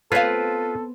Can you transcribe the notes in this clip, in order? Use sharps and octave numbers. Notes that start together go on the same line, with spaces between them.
B3 C4 F4 A4 B4 C#5 F5